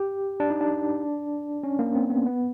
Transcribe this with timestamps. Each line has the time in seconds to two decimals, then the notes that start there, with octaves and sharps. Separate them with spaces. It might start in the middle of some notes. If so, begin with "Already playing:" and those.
Already playing: G4
0.40 D4
0.50 D#4
0.61 D4
1.63 C#4
1.79 A#3
1.95 C4
2.10 B3
2.26 B3